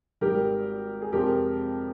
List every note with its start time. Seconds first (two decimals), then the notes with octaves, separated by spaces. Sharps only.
0.21 G#1 G#2 G3 G4 A#4
1.02 G#4
1.12 F2 C3 F3 G#3 G4 A#4